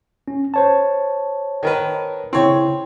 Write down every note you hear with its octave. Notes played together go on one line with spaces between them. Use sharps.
C#4
C5 C#5 A5
D#3 A#4 B4
C#3 C4 E4 C#5